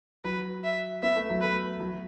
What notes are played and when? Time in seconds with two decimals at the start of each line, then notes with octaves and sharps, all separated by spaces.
0.24 F#3 B4
0.64 E5
1.02 B3 E5
1.16 A3
1.30 F#3
1.41 A3 B4
1.80 F#3